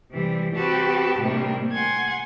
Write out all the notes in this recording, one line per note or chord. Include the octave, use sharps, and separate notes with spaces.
C3 E3 G3
C4 F#4 G4 B4 G5 A5
A2 C3 D#3 G3 A#3 D4
F#5 G#5 C6 G#6